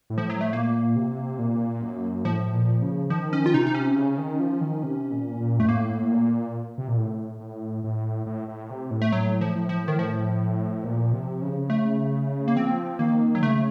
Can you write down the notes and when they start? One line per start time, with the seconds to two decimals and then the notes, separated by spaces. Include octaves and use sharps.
0.10 A2
0.18 F3
0.30 F#3
0.41 A3
0.52 A#2 A#3
0.96 C3
1.39 A#2
1.82 F#2
2.24 A2 F3
2.54 A#2
2.82 C#3
3.10 D#3 F3
3.33 C#4
3.46 F4
3.54 C3 D#4
3.67 D#4
3.75 C#4
3.96 C#3
4.18 D#3
4.40 F3
4.61 D#3
4.83 C3
5.11 A#2
5.40 A#2
5.59 F#2 A3
5.68 A2 A#3
6.12 A#2
6.78 C3
6.88 A#2
6.97 A2
7.40 A2
7.84 A2
8.26 A2
8.48 A2
8.70 C3
8.91 A2
9.02 A3
9.12 A2 F#3
9.41 F3
9.55 A2
9.69 F3
9.88 D#3
9.99 F3
10.84 A#2
11.13 C3
11.42 C#3
11.70 A3
12.48 A#3
12.56 F3 C4
12.99 D#3 A#3
13.35 F#3
13.42 C#3 A3